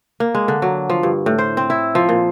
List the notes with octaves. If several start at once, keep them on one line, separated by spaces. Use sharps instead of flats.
A#3
G#3
D3
F#3
F3
G2
A2
C5
C4
E4
F3
A#2